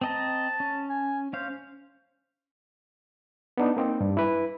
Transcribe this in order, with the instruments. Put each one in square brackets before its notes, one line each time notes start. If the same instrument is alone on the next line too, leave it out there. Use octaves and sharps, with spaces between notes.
[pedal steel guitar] C4 D#5 A#5 [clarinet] A5
[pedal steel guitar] C#4
[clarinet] G#5
[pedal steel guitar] C#4 F5 [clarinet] C5
[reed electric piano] B3 D4 D#4
A#3 C4 D#4
G2
E4 B4